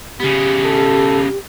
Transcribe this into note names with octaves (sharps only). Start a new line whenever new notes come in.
C#3 B3 G4
A4